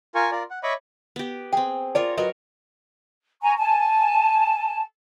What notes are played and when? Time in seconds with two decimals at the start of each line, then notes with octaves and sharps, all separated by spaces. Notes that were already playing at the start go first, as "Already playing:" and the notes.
0.15 F4 A#4 G#5 C#6
0.32 F4 A#4 D5
0.50 F#5
0.63 C#5 D#5 E5 B5 C#6 D6
1.16 B3 G4
1.53 C4 G#4 G5
1.95 F4 A#4 C#5 D5
2.17 F#3 A#4 B4 C#5 D#5
3.42 G#5 A#5 C#6
3.58 G#5 A5